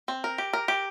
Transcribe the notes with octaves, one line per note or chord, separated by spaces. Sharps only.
C4
A#4
G4
A#4
G4